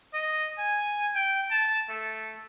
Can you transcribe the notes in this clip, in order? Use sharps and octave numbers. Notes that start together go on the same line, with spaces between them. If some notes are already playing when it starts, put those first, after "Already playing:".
D#5
G#5
G5
A5
A3